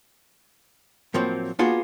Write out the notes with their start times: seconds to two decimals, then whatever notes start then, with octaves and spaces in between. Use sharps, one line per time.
1.14 A2 F3 F#3 A#3 C4
1.59 A#3 B3 D4 F4 F#4 G#4